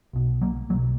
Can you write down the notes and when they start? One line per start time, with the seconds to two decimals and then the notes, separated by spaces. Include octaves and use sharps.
0.13 B1 B2
0.42 F#3 A#3
0.70 B1 F#3 A#3
0.75 B2